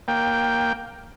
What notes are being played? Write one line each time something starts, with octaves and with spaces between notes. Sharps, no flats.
A#3 G5